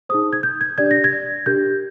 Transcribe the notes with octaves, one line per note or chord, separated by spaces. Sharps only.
D#4 G#4 C5 D#6
G#6
G6
G#6
D4 G4 D5 G#6
A#6
G#6
D4 G4 A#4 G6